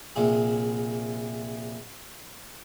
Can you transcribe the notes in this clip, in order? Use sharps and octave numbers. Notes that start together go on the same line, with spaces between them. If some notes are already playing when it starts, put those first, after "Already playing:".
A#1 C3 G#4